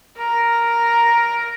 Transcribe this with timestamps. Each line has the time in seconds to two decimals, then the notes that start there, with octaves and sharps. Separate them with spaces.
0.17 A#4